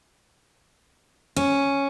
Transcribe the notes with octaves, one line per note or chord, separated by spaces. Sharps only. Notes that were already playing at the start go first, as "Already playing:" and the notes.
C#4